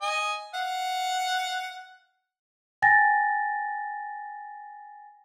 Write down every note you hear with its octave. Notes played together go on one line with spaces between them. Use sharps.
D#5 G#5
F5 F#5
G5 G#5 A6 A#6